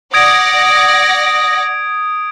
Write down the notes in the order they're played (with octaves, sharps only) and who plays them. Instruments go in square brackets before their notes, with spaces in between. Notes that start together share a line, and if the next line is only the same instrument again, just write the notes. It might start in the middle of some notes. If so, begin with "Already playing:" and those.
[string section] D5 F#5 A#6 [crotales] D#6 G#6 D7